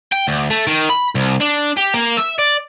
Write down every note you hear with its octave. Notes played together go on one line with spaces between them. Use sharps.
G5
D2
A3
D#3
B5
C2
D4
G4
A#3
E5
D5